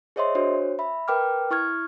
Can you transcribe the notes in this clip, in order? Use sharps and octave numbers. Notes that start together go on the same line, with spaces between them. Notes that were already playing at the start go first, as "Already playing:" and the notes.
G#4 C5 C#5 D#5 E5 C6
D4 F#4 C5 C#5
E5 B5
A#4 B4 G5 D6 F6
E4 C#6 F6 G#6